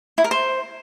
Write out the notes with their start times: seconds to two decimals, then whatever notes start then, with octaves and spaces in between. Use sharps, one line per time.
0.18 E4
0.24 A#4
0.31 C5